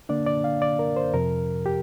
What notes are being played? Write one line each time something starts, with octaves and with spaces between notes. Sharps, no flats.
D3 A#3 D4 D5
D5
F5
D5
A#4
C5
F2 C3 F3 A#4
G4